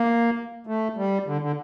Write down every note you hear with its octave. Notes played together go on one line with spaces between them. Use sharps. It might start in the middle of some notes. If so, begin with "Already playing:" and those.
Already playing: A#3
A3
G3
D3
D3